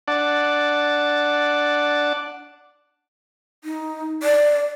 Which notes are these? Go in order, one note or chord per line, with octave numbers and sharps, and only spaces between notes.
D4 D5 F#5 A5
D#4
D5